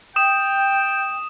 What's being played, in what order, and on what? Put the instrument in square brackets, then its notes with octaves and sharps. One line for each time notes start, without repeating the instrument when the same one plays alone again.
[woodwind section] G5 [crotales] D#6 E7